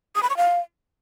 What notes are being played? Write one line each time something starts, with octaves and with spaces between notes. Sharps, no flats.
D#6
B5
C#6
F5